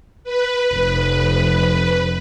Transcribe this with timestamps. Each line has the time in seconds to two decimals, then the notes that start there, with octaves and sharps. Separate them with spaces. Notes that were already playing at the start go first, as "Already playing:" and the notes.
0.24 B4
0.73 F1